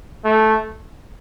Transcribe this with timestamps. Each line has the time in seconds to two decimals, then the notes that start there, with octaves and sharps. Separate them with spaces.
0.25 A3